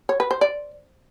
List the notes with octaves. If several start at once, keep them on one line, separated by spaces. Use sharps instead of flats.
C#5
B4
C5
D5